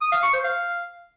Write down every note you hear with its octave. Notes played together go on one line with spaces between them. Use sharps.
D#6
F5
C#6
C5
F5